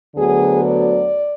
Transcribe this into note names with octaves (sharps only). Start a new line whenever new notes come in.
D2 D3 F#3 B3 G#4
D5